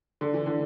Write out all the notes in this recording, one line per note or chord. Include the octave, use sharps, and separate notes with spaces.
D3
E3
D3